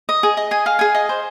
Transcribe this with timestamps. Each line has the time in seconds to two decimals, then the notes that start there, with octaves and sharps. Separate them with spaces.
0.09 D#5
0.23 G#4
0.37 D#5
0.51 G#4 G#5
0.66 G#4 F5
0.79 G#4 G#5
0.95 D#5
1.09 C5